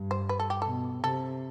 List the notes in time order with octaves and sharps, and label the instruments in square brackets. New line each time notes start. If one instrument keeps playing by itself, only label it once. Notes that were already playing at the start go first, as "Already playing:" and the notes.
Already playing: [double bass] G2
[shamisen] C5
B4
A4
G4
[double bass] B2 [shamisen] A4
[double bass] C3 [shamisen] A4